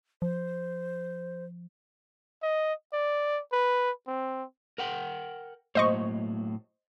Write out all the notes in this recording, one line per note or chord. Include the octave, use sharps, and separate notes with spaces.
F3 C5
D#5
D5
B4
C4
A#4 F#5 G5
A2 F#3 A#3 C5 D#5 C#6